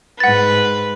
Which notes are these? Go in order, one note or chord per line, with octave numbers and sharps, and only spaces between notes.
G#2 B4 F#5 A6